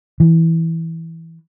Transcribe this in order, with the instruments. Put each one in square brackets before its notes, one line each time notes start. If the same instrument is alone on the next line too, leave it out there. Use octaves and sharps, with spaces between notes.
[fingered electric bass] E3